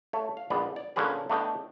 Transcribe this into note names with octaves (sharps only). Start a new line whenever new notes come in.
A3 C#5
F5
A#1 G#2 B3 B4 D5
D5
A#2 D3 C#4 G#4 B4
A3 B3 D4 D#5 G5